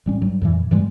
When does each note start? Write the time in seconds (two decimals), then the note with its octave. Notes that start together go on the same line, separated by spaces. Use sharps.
0.06 A1 G3 C#4
0.21 G2 F#3
0.41 F2 A#2 E3
0.71 G2 E3 G3 G#3